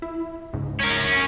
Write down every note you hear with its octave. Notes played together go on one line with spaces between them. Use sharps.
E4
C#2 G#2
C#4 A#4